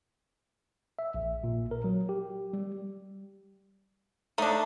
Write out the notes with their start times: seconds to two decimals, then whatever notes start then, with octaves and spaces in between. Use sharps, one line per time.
0.99 E5
1.14 A#1
1.44 A#2
1.71 A#4
1.84 F#3
2.09 G4
2.53 G3
4.38 A3 D4 D#4